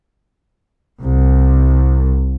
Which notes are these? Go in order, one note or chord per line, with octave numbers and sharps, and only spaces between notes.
C2